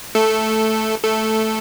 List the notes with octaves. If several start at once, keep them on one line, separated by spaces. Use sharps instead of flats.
A3 A4
A3 A4